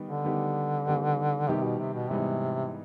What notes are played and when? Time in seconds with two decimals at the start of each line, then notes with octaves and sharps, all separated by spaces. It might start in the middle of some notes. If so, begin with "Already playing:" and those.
Already playing: D#3 G3 B3 D#4 G4
0.09 D3
0.24 D#3 G3 B3 D#4 G4
0.86 D#3 G3 B3 D#4 G4
1.48 C3 D#3 G3 B3 D#4 G4
1.63 B2
1.79 C3
1.94 B2
2.09 G#2 C3 E3 G3 B3 D#4